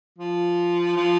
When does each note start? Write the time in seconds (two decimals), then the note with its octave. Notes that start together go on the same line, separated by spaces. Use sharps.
0.19 F3
0.97 F3